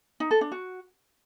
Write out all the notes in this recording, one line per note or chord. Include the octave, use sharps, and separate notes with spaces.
D#4
A4
D4
F#4